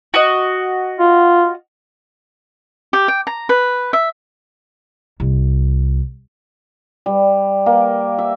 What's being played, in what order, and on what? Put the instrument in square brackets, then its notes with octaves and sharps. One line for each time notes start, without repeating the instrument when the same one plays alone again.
[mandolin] F#4 D#5
[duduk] F4
[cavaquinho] G4
G5
A#5
B4
E5
[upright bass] C2
[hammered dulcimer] G3
A#3
E5